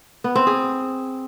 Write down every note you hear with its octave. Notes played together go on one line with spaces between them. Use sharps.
B3
C4
G#4